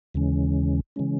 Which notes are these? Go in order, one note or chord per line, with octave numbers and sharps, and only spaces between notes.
D#2 C#3 E3 G#3 C#4
C#3 E3 G#3 C#4